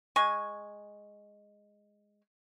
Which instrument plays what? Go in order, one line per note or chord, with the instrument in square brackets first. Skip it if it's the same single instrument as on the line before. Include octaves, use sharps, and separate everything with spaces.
[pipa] G#3 G#5 C#6